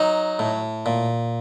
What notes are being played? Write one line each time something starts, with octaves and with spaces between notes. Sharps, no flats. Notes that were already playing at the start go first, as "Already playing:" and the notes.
Already playing: F#3 D#4
A2
A#2